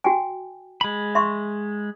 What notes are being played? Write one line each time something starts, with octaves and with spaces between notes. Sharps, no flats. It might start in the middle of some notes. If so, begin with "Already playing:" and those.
F#4 G5 G#5
G#3 B5
E5 C6 C#6